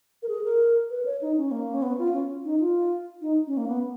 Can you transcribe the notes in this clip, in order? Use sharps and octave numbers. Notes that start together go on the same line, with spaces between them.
A#4
G#4
A#4
B4
C#5
D#4
C#4
A#3
C#4
B3
F4
C#4
D#4
F4
D#4
C#4
A#3
B3